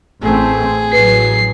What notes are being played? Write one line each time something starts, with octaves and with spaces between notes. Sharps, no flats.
A1 A3 C4 G#4
A1 F#3 B4 C7